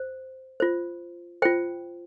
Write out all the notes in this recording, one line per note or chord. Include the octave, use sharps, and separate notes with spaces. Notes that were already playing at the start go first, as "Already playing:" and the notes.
Already playing: C5
F4 C5
F4 C5 G5